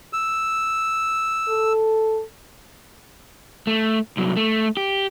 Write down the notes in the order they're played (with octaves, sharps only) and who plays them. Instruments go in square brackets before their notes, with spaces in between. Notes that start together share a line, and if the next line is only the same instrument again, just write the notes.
[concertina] E6
[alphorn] A4
[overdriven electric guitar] A3
C2 F#3
A3
G4